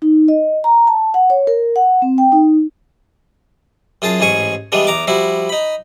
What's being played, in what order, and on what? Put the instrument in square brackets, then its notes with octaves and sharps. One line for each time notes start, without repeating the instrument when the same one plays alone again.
[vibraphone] D#4
D#5
A#5
A5
F#5
C#5
A#4
F#5
C4
G5
D#4
[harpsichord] F#2 F4 G#4 A5
A1 G#2 G#4 G#5 C#6
E3 G3 G#3 B3 D4
E2 A#5 D6
F3 G3 E4 F#4
D#4 B5